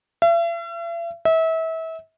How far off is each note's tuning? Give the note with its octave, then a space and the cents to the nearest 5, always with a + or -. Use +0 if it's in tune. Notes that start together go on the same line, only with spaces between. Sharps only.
E5 +45
E5 -30